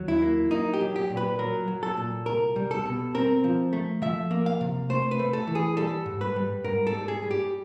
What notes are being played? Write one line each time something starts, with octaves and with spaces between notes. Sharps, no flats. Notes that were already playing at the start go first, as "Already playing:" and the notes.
Already playing: D#2 F#3
E4
A#3
A#3 D#4
G4
F#3
G4
A#2
B4
F#3 A#4
F#3
A4
A#2
C2 A#4
G3
A4
B2
C4 A#4
F3
A3
F3 E5
A#3
F5
C3
A3 C5
B4
A3
A4
E3
G#4
G3 A4
G#2
B4
G3
G#2 A#4
A4
G3
G#4
G3
G4